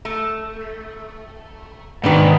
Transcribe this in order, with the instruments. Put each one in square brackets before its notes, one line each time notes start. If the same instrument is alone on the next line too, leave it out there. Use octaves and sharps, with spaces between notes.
[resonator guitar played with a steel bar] A3
[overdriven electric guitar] G#2 D#3 [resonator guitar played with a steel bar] B2 D4 B4